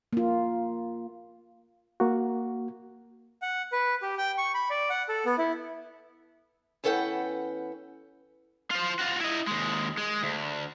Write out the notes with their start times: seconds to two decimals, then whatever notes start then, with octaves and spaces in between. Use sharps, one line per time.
0.13 A#3 F4
2.00 A#3 F#4
3.42 F#5
3.72 B4
4.02 G4
4.18 G5
4.38 C#6
4.54 B5
4.70 D5
4.90 F#5
5.09 A4
5.25 B3
5.38 E4
6.84 E2 C#4 A4 B4 F#5 G5
8.71 F4 C5
8.99 F4 F#4
9.20 E4 D#5
9.47 D#2 G#3
9.98 G#3
10.23 D2